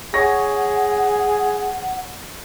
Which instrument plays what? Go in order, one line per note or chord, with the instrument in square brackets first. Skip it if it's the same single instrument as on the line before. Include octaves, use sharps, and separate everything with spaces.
[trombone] G#4 [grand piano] C#5 C#6 A#6 [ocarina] F#5